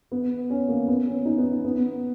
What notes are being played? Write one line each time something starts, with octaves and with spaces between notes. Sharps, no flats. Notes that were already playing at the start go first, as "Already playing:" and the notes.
B3
C#4
A#3
B3
C#4
D#4
B3
B3